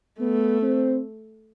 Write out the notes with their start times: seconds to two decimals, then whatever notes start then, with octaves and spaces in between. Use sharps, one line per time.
0.19 A3 B3
0.62 C4